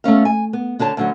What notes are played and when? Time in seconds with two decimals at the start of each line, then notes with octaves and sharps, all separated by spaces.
0.04 A3 B3 C#4 F5
0.25 G#5
0.53 B3
0.79 D3 D4 C#5 A5
0.97 D2 D3 F#3